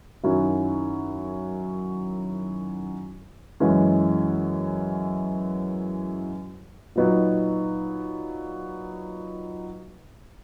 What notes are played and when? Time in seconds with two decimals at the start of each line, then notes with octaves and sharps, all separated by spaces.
0.23 F#2 D#3 F#3 C#4 E4
3.60 F#2 E3 G#3 C#4
6.96 A#2 F#3 B3 D#4